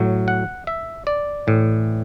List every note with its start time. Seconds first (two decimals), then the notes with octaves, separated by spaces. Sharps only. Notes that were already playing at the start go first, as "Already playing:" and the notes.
Already playing: A2 F#3
0.28 F#5
0.67 E5
1.07 D5
1.47 A2 E3